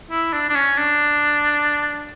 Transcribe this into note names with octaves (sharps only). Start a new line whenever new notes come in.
E4
D4
D4
C#4
D4